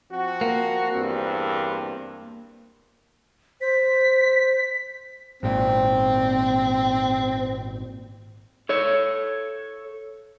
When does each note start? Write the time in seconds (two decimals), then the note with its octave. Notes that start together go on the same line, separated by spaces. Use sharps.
0.11 F3 C4 F#4
0.41 A#3
0.93 E2 G2 C4
3.61 C5 B6
5.43 G#1 A#2 C4
8.69 A4 C#5